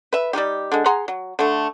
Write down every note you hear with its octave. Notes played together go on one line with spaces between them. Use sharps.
B4 E5
G3 G#3 D#4 G4
D3 G#3
G#4 F#5 A#5 C6
F#3
D3 A3